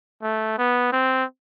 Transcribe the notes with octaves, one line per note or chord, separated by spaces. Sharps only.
A3
B3
C4